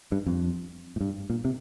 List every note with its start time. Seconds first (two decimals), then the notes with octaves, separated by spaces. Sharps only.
0.12 G2
0.26 F2
0.96 A2
1.01 G2
1.30 A#2
1.45 C3